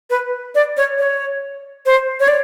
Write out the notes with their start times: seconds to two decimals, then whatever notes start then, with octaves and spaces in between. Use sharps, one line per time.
0.10 B4
0.55 D5
0.77 C#5
0.98 C#5
1.86 C5
2.20 C#5
2.28 D5